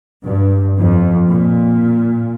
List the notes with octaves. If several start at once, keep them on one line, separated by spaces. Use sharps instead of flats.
G2
F2
A#2